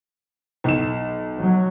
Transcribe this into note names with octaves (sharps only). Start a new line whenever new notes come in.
B1 E7
F#3